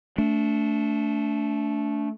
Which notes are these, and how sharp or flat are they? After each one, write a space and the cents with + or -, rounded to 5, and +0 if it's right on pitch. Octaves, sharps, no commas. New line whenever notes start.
A3 +0 D4 -30